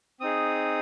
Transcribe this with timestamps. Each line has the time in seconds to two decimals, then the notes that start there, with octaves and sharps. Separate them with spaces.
0.20 C4 D#4 G#4 D#6